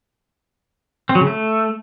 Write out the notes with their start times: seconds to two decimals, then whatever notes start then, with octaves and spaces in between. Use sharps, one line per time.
1.09 C4
1.15 F#3
1.21 C#3
1.27 A3